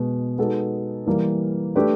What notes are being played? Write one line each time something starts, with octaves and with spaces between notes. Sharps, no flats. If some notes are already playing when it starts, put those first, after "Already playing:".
Already playing: B2 G#3 B3
G#3 B3 D#4 F#4 A4
E3 G3 A#3
A3 D4 G4 B4 D5